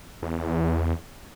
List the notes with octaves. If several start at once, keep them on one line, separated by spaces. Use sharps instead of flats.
E2